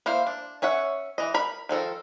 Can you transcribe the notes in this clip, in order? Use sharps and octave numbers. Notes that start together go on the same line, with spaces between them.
A#3 E4 C5 F5
D4
C#4 C#5 E5 F#5
E3 D#5
A#4 B5
D#3 F3 A4 A#4